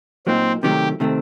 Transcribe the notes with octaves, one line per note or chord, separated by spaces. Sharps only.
A#2 F#3 A#3 C4 D#4
C3 D#3 F#3 A3 G4
C3 D#3 A3 C4